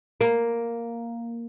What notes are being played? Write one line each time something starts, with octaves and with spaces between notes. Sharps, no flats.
A#3